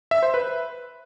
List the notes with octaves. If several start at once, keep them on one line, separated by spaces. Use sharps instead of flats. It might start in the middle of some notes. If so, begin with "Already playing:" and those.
E5
C5
B4